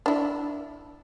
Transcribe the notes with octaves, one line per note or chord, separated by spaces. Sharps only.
D4 E4